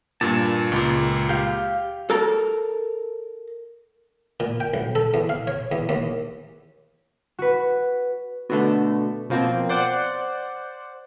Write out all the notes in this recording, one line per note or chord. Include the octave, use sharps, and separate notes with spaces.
G2 A#2 A5
C#2 A#2
G4 F5
A4 A#4 A5 A#5
A#2
G5
B1
A4
E2
F5
C#5
E2
D#2
F#4 B4
B2 D3 A3
B2 F3 A#3 C4
C5 D5 F#5